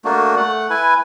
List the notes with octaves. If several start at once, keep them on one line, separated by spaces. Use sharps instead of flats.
A3 A#3 D4 F#4
A3 F#5
E4 B4 G#5